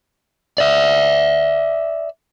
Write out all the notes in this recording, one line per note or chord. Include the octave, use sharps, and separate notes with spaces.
D5 E5